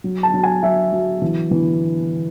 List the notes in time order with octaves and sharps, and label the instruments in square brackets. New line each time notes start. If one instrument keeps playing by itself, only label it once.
[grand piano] F#3
A5
F#3
G#5
F#3 E5
F#3
E3
E3